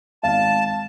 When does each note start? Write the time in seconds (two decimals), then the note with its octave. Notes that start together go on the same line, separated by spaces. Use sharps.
0.23 G#1 F5 A5